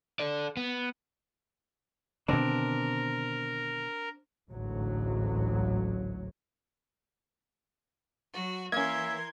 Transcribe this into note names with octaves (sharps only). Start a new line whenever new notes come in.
A4 D5
B3
B2 D3 D#3 C4 D4 A#4
A1 D2 G#2 F#3
F#3 F#4
E3 A#3 C#4 A#4 E5 C6 G#6